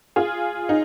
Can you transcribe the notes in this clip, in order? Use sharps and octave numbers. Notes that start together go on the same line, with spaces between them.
F4 G#4
D#4